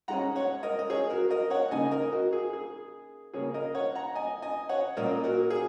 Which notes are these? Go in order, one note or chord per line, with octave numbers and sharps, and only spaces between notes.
G#2 G#3 C#4 F#5 A#5
C#5 F#5
A#4 D#5
D#5
G#4 C#5
F#4 A#4
A#4 D#5
C#5 F#5
C#3 A#3 D#4 D#5 G#5
A#4 D#5
F#4 A#4
G#4
G#4
C#3 A#3 C#4 G#4 C#5
A#4 D#5
C#5 F#5
F#5 A#5
D#5 G#5
D#5 G#5
C#5 F#5
A#2 A#3 C#4 A#4 D#5
F#4 A#4
G#4